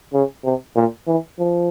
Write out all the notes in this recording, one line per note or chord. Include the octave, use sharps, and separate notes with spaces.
C#3
C3
A#2
E3
F3